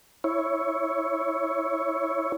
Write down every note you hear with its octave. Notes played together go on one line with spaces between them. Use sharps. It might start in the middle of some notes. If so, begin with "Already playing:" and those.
E4 C#5